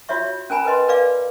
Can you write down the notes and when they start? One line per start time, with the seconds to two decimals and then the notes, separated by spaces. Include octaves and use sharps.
0.09 F4 F#4 C#5 E5 C#6
0.50 C#4 A#4 G#5 A#5 B5
0.65 A#4 B4 D#5 C6
0.88 A#4 B4 D5 F5 D6